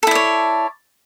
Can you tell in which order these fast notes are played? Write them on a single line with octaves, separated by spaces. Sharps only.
A4 E4 D5 C#5